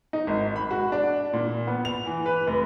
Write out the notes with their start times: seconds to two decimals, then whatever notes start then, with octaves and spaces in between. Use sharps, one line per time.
0.13 D#4
0.27 G#1
0.56 B5
0.71 F#4
0.92 D4
1.33 A#2
1.67 B3
1.85 F7
2.06 E3
2.26 B4
2.47 F1